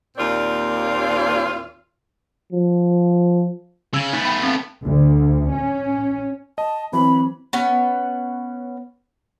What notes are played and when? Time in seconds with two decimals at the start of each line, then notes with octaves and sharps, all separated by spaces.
0.17 D#2 A#2 C4 F4 A#4 D5
2.52 F3
3.94 C#3 E6 G#6 F#7
4.13 A3 B3 D#4
4.25 G5 B5
4.43 C4 A5
4.84 D2
5.52 C#4
6.58 D#5 A5
6.93 E3 F#3 C4 B5
7.53 B3 C#4 F#5